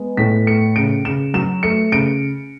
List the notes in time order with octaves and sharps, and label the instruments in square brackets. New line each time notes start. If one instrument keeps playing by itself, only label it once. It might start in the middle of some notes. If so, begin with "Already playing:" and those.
Already playing: [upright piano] G#3 B3
A2 B6
A3 C#7
C#3 D7
C#3 E7
F#3 E7
A3 C#7
C#3 D7